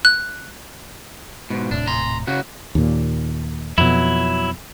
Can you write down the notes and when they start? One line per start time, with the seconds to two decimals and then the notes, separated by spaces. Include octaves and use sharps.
0.05 F#6
1.50 G#2 B2
1.71 D#1 A2 C3 D4
1.87 A#5 C6
2.27 C#3 F#4
2.75 D#2 A#2
3.78 F2 B2 F#3 E4